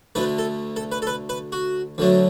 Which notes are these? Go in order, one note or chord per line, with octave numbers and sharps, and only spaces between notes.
D2 D3 A3 B4
A4
A4
B4
A4
B4
B4
F#4
D2 D3 F#3 A3